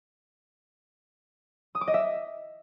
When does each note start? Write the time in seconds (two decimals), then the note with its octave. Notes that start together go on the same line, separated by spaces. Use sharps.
1.75 D#6
1.81 D6
1.87 D#5
1.94 E5